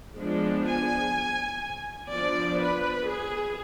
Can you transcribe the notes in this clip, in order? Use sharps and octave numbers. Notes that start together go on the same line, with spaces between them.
F3 G#3 B3 D4
G#5
F3 B3 D4 D5
B4
G#4